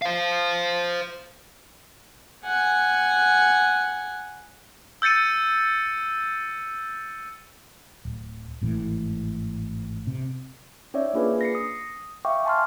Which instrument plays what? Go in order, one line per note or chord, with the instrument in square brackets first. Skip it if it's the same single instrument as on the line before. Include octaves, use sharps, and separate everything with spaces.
[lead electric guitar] C5 F5
[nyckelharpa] F#5 G#5
[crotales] E6 G6 A6 C#7 D#7
[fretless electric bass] D1
G#1 A2 E3
C3
[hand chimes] C#4 D#4 C#5 D5 E5
A#3 D4 F4 G#4 B4
A#6 C7 C#7
D#6
E5 F5 G5 C#6 D6
G#5 A5 C6 F6